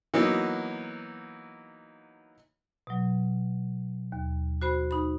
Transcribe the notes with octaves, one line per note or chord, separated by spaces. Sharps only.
E3 F#3 A#3 B3 D#4
B2 F#3
D#2
F#4 C5 B5
D#4 B5